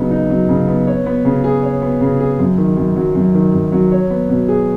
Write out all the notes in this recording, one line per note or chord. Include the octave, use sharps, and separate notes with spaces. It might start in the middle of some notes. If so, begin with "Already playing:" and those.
Already playing: C#3 F#3 B3 D#4
D#4
F#3
C#3
B3
C#5
B3
C#3
G#4
C#5
B3
C#3
G#4
F#2
D#3
F#2
F#3
F#2
D#3
F#2
F#3
C#5
B3
B2
G#4